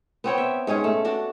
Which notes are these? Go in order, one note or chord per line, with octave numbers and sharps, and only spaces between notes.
B3 C4 C#5 G5
E5
G#2 C#4 G#4 C#5
A3
D4 F#4